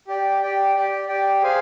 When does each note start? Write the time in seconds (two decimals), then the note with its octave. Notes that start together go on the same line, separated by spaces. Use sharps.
0.08 G4 D5 G5
0.42 G4 D5 G5
0.75 G4 D5 G5
1.08 G4 D5 G5
1.42 G#4 C5 F5 G#5